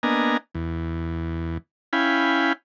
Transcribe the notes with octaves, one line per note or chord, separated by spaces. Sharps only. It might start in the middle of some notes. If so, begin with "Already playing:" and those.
A#3 B3 D4 D#5 G#5 A#5
E2
C#4 E4 F5 G5 G#5 B5